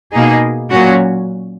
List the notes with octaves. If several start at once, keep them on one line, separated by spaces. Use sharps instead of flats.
B2 A#3 D#4 G#4
A#2 F#3 C#4 F#4